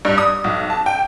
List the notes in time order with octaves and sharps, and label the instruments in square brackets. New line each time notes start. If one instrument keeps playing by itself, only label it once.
[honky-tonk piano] G2
D#6
B1
A5
G5